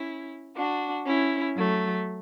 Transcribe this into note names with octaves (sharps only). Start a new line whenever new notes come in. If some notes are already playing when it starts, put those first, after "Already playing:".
Already playing: C#4 E4
D4 F#4
C#4 E4
F#3 A3